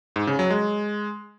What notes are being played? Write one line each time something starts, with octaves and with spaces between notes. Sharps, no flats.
G#2
C#3
F#3
G#3